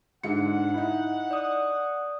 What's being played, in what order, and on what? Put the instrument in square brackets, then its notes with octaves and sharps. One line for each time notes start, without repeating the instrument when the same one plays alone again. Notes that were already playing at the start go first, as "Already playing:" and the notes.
[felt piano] G#2 D3 C#7 [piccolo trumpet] F#5
[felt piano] D#4 E4
[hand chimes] D5 D#6